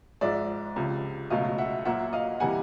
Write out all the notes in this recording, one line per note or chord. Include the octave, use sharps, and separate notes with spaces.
G#2 F3 G#3 D5 E5
C#2 C3 F3
C#2 B2 F#3 A3 D#5 F5
E5 F#5
A#2 F#3 A#3 E5 F#5
D#5 F5
C3 E3 G3 A#3 F#5 G#5